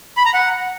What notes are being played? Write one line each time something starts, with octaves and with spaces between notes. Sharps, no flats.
B5
A#5
F#5